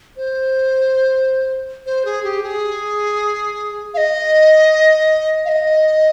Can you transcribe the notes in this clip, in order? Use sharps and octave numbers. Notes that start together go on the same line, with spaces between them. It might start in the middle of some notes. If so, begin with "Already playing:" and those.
C5
C5
G#4
G4
G#4
F5
D#5
F5
D#5